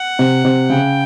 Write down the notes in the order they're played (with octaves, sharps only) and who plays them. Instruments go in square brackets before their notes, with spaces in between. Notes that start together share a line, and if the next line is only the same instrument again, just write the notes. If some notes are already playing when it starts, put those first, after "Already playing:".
Already playing: [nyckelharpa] F#5
[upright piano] C3
C3
[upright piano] C#3 [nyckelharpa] G5